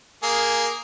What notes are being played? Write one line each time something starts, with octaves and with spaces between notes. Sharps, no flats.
A#3 G#4